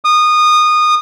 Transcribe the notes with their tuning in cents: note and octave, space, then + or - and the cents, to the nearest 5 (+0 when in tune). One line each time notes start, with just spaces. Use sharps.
D#6 -20